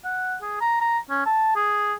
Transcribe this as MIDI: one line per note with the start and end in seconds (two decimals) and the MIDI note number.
0.05 0.36 78
0.42 0.61 68
0.61 0.80 82
0.81 0.99 82
1.10 1.25 61
1.26 1.54 81
1.56 1.94 68